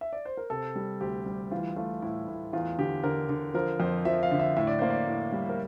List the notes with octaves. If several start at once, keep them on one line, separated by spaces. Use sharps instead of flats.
E5
D5
C5
A#4
C3 A4
G3
D2 G4
G3
E3 F4
A3 F4
A2 E4
A2
E2 F4
D3 G4
D3 A#4
D3
F3 A#4
F2 C5
F3 E5
F5
D3
E5
A2 E5
D5
A#3 C5
D5
A2
G3
A#4